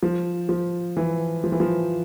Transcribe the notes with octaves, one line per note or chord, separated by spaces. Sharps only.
F3
F3
E3
F3
E3
F3